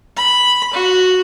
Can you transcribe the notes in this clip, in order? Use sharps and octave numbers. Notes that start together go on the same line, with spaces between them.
B5
F#4